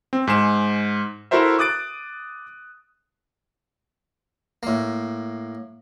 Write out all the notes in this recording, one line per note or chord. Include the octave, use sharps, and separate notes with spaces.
C4
G#2 G#4 E7
E4 F#4 A4 A#4 C5 E5
D6 D#6 F#6 A6 D7
A2 A#3